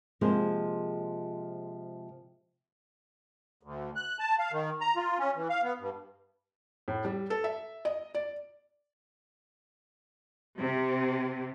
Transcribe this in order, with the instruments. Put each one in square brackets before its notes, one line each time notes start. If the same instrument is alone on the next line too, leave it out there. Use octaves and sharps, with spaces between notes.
[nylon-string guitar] C3 F3 G#3 A#3 G#4 C5
[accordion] D2
F#6
A5
F5
D#3
A#5
F4
C#4
E3
F5
B3
G2
[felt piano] A2
G3
A4
E5
D#5
D5
[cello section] C3